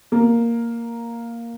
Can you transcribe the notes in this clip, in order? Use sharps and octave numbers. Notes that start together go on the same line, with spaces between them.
A#3